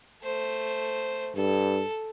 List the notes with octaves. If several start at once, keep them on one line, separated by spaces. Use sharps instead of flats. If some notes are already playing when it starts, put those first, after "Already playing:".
A3 C5
G2 A4